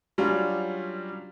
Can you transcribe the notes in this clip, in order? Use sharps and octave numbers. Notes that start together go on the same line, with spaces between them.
F#3 G3 C#4 D4 F4